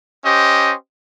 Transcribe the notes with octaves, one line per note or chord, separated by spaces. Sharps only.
C#4 G4 C5 D#5